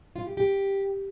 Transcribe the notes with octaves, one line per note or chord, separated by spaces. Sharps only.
F4
G4
G4